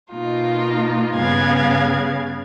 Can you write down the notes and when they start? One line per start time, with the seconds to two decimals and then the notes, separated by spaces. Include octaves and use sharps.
0.11 B2 A#3 D#4 F4
1.16 G2 C#3 B3 F5 G#6